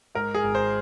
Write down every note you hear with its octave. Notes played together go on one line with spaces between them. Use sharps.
G#2 A#4
G#4
G#1
C5